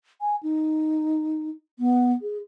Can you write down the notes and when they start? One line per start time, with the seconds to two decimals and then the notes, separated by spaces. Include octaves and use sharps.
0.21 G#5
0.43 D#4
1.79 B3
2.22 G#4